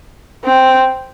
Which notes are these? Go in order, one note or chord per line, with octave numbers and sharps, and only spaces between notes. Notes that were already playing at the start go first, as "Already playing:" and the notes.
C4